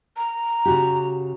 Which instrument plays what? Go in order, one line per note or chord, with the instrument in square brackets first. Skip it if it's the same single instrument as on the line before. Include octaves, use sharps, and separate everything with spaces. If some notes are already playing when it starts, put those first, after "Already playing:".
[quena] A#5
[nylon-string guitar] C#3 F#4 G4